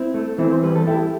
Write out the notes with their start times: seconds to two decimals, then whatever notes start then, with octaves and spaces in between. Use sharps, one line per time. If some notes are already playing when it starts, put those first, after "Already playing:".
Already playing: C4 E4
0.14 A3
0.38 E3 C4 E4
0.51 C5
0.63 G3 B4
0.76 A4
0.87 A3 E4 G4